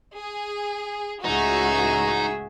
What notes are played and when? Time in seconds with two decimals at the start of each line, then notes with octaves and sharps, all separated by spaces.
0.16 G#4
1.25 C#2 A2 D#4 F#4 G#4 E5